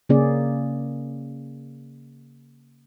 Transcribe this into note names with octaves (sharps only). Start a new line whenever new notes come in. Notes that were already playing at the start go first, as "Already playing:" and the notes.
C#3 A#3 C#4 G#4 D5